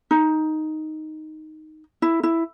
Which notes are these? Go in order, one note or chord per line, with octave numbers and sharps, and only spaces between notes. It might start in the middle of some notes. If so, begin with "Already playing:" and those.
D#4
E4
E4